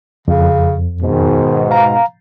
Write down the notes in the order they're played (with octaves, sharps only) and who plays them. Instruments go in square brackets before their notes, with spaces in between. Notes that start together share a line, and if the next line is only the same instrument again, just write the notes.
[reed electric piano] F2 [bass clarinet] C#3
[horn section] G#2 B2 [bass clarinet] D#3
[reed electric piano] F5 A#5